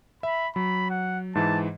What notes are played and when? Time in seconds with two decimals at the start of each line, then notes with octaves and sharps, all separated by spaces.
0.23 E5 B5
0.56 F#3 B5
0.90 F#5
1.35 G#2 E3 A5